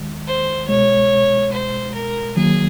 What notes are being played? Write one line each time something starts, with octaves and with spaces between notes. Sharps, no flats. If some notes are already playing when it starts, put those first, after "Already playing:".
Already playing: D#2 D#3 G#3
C5
C2 B2 G#3 C#5
C5
A#4
D#3 F#3 A#3 G#4